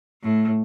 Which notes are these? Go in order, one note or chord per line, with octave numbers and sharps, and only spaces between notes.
A2